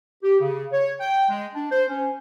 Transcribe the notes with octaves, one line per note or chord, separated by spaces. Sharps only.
G4
C#3
C#5
G5
G#3
D4
C5
C#4